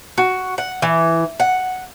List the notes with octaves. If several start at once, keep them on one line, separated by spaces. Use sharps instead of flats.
F#4
F#5
E3
F#5